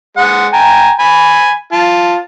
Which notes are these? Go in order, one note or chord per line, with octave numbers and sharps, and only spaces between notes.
G#3 F#5
G5 G#5 A#5
G#5 B5
F4 A5